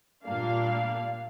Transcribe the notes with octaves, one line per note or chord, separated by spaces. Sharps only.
A#2 G3 A#3 D4 F5